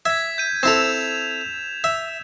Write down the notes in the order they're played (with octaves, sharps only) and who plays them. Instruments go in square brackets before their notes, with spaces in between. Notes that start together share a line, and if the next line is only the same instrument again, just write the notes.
[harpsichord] E5 [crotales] G#6 B6
[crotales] G6 D#7
[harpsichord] C4 E4 A4 [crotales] E7 F7
[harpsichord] E5